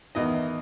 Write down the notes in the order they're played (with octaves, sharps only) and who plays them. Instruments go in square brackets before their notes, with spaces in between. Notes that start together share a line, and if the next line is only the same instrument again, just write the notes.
[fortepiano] E2 D#3 D#5